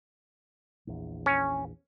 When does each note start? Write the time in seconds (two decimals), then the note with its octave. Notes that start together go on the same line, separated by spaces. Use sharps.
0.87 A#1 E2
1.26 C#4